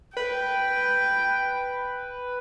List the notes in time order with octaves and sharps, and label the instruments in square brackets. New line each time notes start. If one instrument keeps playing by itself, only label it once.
[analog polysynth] B4 [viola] G5